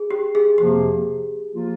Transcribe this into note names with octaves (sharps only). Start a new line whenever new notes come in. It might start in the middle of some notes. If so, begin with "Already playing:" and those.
Already playing: G#4
G4
G#4
F2 C3 F3 A#3 G4
F3 A#3 F4